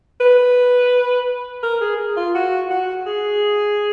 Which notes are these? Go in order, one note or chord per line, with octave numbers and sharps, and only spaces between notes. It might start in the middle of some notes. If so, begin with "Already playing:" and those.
B4
A#4
G#4
F4
F#4
F#4
G#4